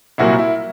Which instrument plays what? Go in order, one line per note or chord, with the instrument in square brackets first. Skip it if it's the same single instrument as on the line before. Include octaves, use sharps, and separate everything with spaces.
[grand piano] C2 A#2 F#3 A#3 E4 F#4
E4